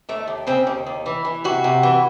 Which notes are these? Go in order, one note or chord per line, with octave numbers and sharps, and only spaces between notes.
D#2 A3
D#2
C#3 C4
D#2
D#2
E3
E3
C3 F#4
C3
E3